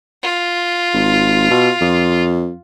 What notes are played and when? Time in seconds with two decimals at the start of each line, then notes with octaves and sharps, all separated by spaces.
0.23 F4
0.94 G#1
1.51 B2
1.81 F2